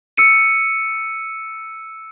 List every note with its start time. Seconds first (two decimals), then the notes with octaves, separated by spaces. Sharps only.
0.17 E6 C#7 D#7